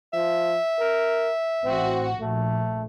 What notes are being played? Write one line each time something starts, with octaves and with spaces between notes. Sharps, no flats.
F3 E5
A#4
A1 C4 F#4
A#1 A3